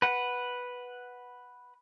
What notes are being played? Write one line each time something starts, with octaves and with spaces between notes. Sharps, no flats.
B4 F#5